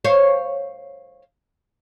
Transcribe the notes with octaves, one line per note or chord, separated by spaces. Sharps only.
C5 C#5 F5